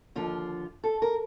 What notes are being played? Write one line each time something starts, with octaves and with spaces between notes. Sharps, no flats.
D#2 D3 F3 F4
A4
A#4